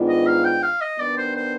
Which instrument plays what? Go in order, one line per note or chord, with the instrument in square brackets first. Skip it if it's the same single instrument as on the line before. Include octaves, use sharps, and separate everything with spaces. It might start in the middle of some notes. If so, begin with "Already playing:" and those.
Already playing: [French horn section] G#2 D#3 B3 D4 F4
[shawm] D#5
F5
G5
F5
D#5
[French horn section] D#3 G3 B3 D4 [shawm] D5
[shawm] C5
C5